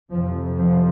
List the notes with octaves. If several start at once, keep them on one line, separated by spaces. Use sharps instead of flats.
F2 C3 F3
F3